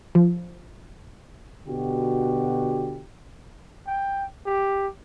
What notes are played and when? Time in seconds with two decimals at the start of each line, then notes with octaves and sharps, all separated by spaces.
0.15 F3
1.67 B2 D3 F#4 G4
3.87 G5
4.46 G4